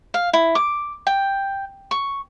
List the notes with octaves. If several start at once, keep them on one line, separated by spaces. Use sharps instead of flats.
F5
E4
D6
G5
C#6